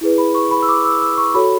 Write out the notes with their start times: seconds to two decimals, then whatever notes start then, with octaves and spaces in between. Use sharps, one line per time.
0.01 E4 G#4 B4
0.18 B5
0.35 C#6
0.51 B5
0.62 E6
0.68 D6
0.85 E6
1.02 E6
1.17 C#6
1.34 F#4 A4 C#5 B5